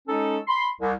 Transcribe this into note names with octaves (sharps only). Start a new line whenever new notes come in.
G#3 C#4 D#4 A4
B5 C6
C2